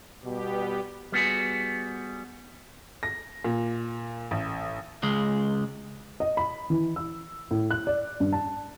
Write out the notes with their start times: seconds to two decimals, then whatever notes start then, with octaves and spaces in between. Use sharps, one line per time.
0.24 B2 G3 B3 G4
1.12 G3 B3 F#4 G#4
3.03 A#6
3.44 A#2
4.31 A1
5.03 C#2 G#3
6.20 D#5
6.37 B5
6.70 E3
6.96 E6
7.51 A2
7.71 F#6
7.87 D5
8.20 G2
8.33 A5